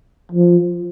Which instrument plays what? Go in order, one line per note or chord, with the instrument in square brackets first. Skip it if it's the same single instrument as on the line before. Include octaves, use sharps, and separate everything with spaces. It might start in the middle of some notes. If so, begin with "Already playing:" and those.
[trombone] F3